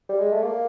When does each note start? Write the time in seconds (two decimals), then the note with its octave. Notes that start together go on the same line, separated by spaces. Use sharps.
0.09 G3
0.20 G#3
0.32 A3
0.43 A#3